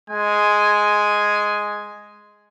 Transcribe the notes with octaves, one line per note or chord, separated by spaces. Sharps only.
G#3 G#5